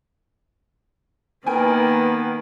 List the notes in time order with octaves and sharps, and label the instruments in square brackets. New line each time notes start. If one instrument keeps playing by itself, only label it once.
[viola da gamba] D#3 A#3 [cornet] B3 [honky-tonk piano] A#4 G5 G#5